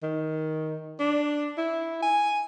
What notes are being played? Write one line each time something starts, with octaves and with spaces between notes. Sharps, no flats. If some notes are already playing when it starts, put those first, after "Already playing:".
D#3
D4
E4
G#5